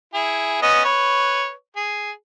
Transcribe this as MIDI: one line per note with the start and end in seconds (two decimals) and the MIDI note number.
0.14 0.62 64
0.14 0.62 68
0.62 0.84 59
0.62 0.84 61
0.62 0.84 75
0.85 1.51 71
0.85 1.51 73
1.76 2.11 68